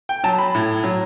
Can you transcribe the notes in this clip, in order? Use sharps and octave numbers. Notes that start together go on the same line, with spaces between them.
G5
F#3 A5
B5
A2
F#3